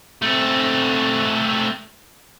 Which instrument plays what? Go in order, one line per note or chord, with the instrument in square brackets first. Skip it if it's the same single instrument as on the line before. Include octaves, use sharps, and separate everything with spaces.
[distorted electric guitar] A3 C4